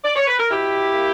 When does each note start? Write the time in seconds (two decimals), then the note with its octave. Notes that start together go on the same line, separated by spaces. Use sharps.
0.04 D5
0.16 C#5
0.27 B4
0.38 A#4
0.50 B2 E4 G4
0.92 A#3